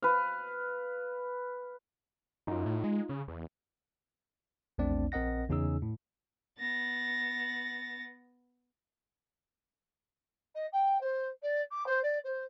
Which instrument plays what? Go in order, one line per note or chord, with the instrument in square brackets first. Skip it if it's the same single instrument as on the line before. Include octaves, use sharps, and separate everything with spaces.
[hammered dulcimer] B4 F5
[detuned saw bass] F#2 [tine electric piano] D#4 F4
[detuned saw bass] A2
G#3
C#3
E2
[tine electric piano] A#1 E2 A3 C4 D4 D5
A#1 C4 A#4 D#5 F#5 A#6
E2 C#3 C#4 D#4 G#4 E6
A2
[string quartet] B3 A6 A#6
[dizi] D#5
G5
C5
D5
D6
C5
D5
C5